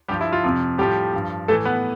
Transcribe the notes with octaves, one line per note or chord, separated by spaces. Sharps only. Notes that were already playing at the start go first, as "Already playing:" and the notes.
G2 F3 G3 G4
E4
F4
F2 C3 F3
A2 F3 G3 G4
G2 F3
A2 E3 A3 A4
B3 B4